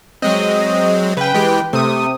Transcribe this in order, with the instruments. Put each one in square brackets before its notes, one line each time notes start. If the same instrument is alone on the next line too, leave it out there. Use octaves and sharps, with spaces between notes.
[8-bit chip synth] F#3 G#3 C4 [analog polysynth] D#5
[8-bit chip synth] C#3 [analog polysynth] B4 G5
[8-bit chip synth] E3 G#3 G4
[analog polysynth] C3 D#6 [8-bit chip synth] A3